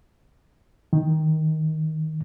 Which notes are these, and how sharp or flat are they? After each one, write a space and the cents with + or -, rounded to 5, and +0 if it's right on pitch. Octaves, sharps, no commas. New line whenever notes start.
D#3 +10